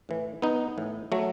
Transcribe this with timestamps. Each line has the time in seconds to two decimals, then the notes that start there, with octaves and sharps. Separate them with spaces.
0.09 A2 E3
0.42 B3 D#4
0.78 A2 E3
1.12 F#3 A3